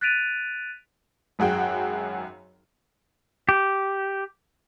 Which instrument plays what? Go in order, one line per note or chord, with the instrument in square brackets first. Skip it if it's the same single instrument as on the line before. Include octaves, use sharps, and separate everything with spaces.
[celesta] F#6 A6 B6 D7 D#7 F7
[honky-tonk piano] G#1 F#2 F#4 G#4 G5
[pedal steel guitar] G4